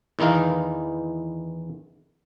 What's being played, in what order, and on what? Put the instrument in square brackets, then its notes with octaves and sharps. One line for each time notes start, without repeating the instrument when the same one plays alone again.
[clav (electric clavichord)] E2 D#3 E3 D#4 F5